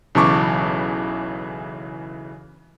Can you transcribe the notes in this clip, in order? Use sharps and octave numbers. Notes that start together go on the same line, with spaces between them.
B1 C#3 E3 A5 C#6 D6